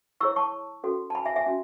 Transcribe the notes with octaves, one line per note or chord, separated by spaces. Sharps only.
E4 G#4 C#5 C#6 E6
A5 C#6
C#4 F#4 A4
A5
G#5 B5
E5 G#5
E5 G#5
C#4 F#4